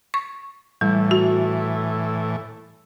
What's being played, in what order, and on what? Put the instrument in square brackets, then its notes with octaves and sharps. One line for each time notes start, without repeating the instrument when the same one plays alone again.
[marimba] C#6
[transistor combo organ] A2 E3 [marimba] G3
[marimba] F#4